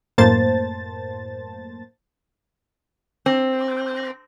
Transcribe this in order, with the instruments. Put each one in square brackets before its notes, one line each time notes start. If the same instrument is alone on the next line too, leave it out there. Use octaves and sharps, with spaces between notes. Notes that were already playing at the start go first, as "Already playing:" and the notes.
[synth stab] F#2 A2 A#3 C5 A5 A6
[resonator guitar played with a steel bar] C4